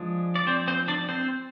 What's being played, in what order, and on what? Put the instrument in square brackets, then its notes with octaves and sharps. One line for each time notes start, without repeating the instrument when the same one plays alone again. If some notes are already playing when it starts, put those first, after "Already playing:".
Already playing: [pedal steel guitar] F3 G#3 D4
D5
C4 C5
C4 C5
D4 D5
C4 C5